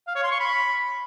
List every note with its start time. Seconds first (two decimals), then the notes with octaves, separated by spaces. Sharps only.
0.08 F5
0.16 C#5
0.24 C6
0.32 C#6
0.40 B5